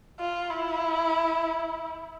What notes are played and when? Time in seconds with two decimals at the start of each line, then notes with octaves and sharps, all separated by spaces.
0.20 F4
0.50 E4